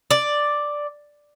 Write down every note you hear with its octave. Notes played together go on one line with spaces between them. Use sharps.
D5